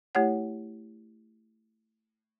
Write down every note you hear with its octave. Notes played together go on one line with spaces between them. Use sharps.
A3 E4 G4 C#5 F#5